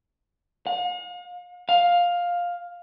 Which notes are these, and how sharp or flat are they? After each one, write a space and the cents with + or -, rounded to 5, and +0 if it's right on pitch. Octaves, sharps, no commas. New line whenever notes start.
F5 +45
F5 +10